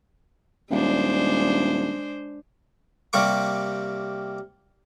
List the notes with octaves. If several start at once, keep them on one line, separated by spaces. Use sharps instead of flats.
D#1 G#3 D4 C5
C3 G3 A#3 C#6 D6